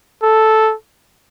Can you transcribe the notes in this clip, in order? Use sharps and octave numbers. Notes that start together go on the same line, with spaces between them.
A4